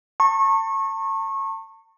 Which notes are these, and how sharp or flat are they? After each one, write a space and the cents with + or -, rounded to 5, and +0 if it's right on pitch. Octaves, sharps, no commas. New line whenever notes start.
A5 +35 C#6 -25